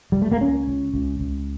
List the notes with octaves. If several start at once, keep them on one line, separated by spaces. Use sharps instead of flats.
G3
A3
A#3
C#2 C#4
C#2
C#2
C#2